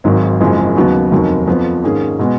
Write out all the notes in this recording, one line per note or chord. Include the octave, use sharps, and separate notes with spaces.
G#1 G#2 D#3 F#3
F#1 F#2 F3 G#3
D#2 C#3 F#3 B3 F#4
F1 D#2 D#3 F#3
F2 F3 B3
G#2 D#3 A#3 C#4 G#4
B2 G#3 B3